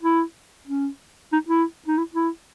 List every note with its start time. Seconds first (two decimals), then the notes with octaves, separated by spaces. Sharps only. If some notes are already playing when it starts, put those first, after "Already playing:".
0.02 E4
0.67 C#4
1.33 D#4
1.49 E4
1.88 D#4
1.98 E4
2.14 E4